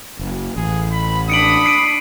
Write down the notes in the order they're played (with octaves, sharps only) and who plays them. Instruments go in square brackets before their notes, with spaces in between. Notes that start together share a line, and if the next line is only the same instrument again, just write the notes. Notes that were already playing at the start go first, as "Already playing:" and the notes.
[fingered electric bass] F#1
[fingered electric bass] A1 [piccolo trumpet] G#4
[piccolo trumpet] B5
[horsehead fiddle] D4 B5 [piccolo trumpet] D#6 [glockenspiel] C#7 D7 F#7
[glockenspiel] C7 D7 D#7